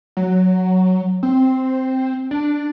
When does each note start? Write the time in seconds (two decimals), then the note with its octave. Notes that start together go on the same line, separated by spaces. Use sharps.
0.17 F#3
1.23 C4
2.31 D4